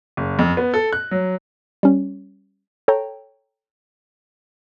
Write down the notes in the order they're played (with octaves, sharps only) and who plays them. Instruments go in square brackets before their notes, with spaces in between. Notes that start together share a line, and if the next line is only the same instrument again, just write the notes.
[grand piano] F#1
F2
B3
A4
F#6
F#3
[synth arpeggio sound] G3 C#4
A4 C#5 G5 A#5